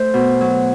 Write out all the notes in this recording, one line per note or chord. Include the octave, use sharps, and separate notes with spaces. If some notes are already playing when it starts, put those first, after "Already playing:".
Already playing: A3 C5
B2
F#3